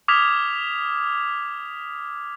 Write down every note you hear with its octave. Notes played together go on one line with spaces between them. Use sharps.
D6 D#6 F6 G#6 B6 F7